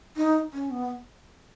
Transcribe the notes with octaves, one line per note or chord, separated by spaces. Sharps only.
D#4
C#4
B3